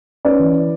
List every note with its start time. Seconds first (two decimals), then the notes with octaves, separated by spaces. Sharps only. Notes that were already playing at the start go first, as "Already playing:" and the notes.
0.25 C#4 B4 D5
0.39 E3
0.54 E4